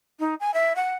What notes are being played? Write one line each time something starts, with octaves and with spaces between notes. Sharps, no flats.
D#4
G#5
E5
F#5